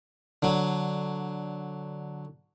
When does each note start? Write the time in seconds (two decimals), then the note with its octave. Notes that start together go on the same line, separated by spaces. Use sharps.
0.42 D3 F#3